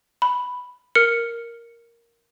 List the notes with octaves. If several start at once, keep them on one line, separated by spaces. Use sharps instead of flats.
B5
A#4 F6 C#7